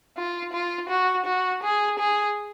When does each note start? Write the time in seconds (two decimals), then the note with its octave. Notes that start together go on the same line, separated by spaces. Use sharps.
0.17 F4
0.53 F4
0.89 F#4
1.26 F#4
1.63 G#4
1.99 G#4